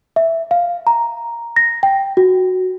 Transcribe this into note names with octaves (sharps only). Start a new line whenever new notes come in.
E5
F5
A#5
A#6
G5
F#4